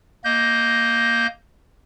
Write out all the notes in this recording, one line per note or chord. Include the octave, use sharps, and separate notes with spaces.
A#3 D#5 G6